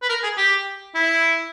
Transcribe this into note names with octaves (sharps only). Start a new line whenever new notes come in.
B4
A#4
G#4
G4
E4